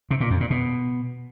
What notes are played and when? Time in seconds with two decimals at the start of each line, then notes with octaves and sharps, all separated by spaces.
0.11 C3
0.21 A#2
0.30 F2
0.40 A#2
0.50 B2